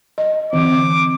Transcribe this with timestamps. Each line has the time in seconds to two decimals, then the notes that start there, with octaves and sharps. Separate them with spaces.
0.18 D#5
0.53 D3 E3 C4 D6